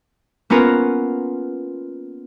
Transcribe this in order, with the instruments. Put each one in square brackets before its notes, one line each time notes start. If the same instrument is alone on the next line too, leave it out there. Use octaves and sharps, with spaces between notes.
[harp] A#3 B3 C#4 F4 A#4 B4